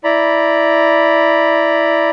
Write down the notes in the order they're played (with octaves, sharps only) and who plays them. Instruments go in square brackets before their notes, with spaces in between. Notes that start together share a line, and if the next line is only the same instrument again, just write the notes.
[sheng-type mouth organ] E4 D5 A#5 B5